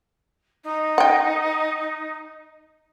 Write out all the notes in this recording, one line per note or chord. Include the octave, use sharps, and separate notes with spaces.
D#4
F#5 G5